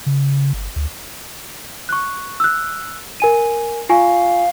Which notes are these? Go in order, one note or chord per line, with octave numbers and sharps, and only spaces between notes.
C#3
G1
D2
C#6 F#6
E6 F#6
A#4 G#5 D#7
F4 F5 G#5 C#6